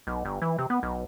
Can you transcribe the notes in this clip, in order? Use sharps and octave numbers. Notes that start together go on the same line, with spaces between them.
B1
G1
E3
C3
B3
B1